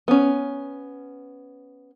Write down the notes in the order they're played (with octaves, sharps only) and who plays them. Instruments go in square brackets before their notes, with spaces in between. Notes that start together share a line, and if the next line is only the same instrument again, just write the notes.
[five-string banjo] B3 C#4